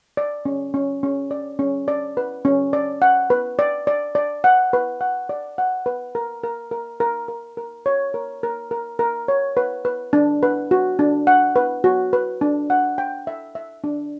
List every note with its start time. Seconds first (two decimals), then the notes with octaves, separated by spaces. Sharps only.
0.17 D5
0.46 C#4
0.74 C#4
1.03 C#4
1.31 D5
1.59 C#4
1.88 D5
2.17 B4
2.45 C#4
2.73 D5
3.02 F#5
3.30 B4
3.59 D5
3.87 D5
4.15 D5
4.44 F#5
4.73 B4
5.01 F#5
5.29 D5
5.58 F#5
5.86 B4
6.15 A#4
6.43 A#4
6.71 A#4
7.00 A#4
7.28 A#4
7.57 A#4
7.86 C#5
8.14 A#4
8.43 A#4
8.71 A#4
8.99 A#4
9.28 C#5
9.57 B4
9.85 B4
10.13 D4
10.43 B4
10.71 F#4
10.99 D4
11.27 F#5
11.56 B4
11.84 F#4
12.13 B4
12.41 D4
12.70 F#5
12.98 G5
13.27 E5
13.55 E5
13.84 D4